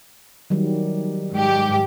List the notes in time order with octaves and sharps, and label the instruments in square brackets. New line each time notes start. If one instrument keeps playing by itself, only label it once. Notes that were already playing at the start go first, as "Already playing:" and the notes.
[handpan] D#3 F#3 G3
[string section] G#2 G4